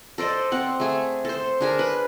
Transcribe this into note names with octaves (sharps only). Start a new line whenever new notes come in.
A4 C5 D5 D#5
C4 F#5
A3 G#4
A4 C5
D4 G#4 A#4
B4